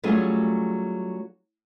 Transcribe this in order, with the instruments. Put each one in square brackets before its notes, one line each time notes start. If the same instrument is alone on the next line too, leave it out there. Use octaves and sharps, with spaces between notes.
[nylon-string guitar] F#3 G3 A3 C#4 F4 G#4